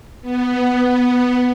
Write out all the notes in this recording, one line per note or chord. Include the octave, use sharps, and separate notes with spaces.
B3